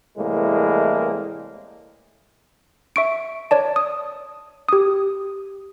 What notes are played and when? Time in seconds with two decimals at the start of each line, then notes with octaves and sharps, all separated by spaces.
0.17 C2 A2 E3 G#3 A#3
2.96 E5 C#6 D7
3.51 C#5 D5 A5
3.76 D#6
4.69 G4 D#6